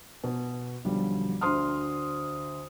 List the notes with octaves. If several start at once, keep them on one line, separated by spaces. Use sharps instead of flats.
B2
B1 D3 F3 G3
D2 D3 C5 C6 D#6 F6